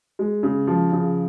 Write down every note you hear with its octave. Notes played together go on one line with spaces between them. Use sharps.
G#3
C#3
F3
C#3